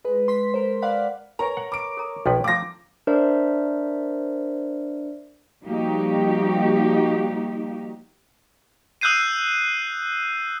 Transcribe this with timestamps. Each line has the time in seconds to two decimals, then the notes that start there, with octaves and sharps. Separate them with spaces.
0.05 G#3 B4
0.28 C6 B6
0.54 A#4 C5
0.82 D5 F5 F#5 B5
1.39 A#4 B4 C#5 G#5 A#5
1.57 F#5
1.72 B5 D6 D7
1.97 A4 A#5
2.26 B1 F3 B4 G5
2.44 F3 A3 C#5 F5 D6 A#6
3.07 D4 A#4 C5 D5 E5
5.63 F3 G3 A#3 D#4 F#4 G4
9.01 D#6 E6 F#6 G6 C7 D#7